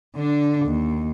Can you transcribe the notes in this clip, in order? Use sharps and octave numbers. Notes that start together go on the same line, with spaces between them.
D3 D4
D#2